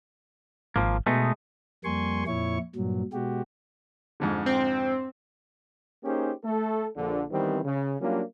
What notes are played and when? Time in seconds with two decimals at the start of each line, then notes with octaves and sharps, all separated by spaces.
0.76 G#1 F3 A#3
1.07 B2 G#3 A3 D#4
1.84 F2 G3 A#3 G#5 C6 C#6
2.27 F2 A#2 E4 C#5 C#6
2.76 G2 A#2 F#3
3.13 B2 G#3 F#4 G4
4.20 F2 G#2 D3
4.46 C4
6.04 A#3 C#4 D#4 G4 G#4 C5
6.43 A3 A4
6.96 A#1 D3
7.30 D#3 E3 G3 B3 C4
7.64 C#3
8.00 F#3 G3 A#3 C#4 D4 F4